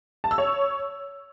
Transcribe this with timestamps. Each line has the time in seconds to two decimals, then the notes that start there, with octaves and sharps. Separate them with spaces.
0.24 A5
0.31 E6
0.38 C#5